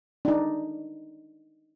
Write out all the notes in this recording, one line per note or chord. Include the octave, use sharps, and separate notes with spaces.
D4 D#4